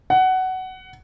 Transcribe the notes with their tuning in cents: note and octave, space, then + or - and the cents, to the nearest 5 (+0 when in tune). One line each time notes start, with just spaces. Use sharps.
F#5 +15